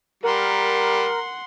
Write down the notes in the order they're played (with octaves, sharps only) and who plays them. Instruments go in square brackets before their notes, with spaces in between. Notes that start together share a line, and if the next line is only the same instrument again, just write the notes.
[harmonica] G3 [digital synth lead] A#4 [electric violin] F#5 C6